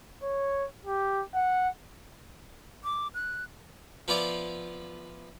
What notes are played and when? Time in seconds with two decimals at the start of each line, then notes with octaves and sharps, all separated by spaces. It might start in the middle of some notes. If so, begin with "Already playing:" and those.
0.23 C#5
0.85 G4
1.35 F#5
2.84 D6
3.14 F#6
4.08 F3 B3 E4 F4 D5 D6